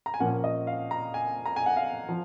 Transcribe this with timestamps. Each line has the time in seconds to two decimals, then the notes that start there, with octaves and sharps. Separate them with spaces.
0.06 A#5
0.14 G#5
0.20 A#2 F3 A#3 C#4 F#5
0.44 D#5
0.67 F5
0.91 A#5
1.14 G#5
1.46 A#5
1.56 G#5
1.66 F#5
1.77 F5
2.09 F3